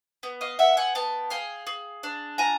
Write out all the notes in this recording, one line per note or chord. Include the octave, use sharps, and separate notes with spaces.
B3
D#5 F5
B3 E5 F#5
F#5 G#5
B3 G5 A5
G#4 F5 G5
G#4
D4
F4 G#5 A#5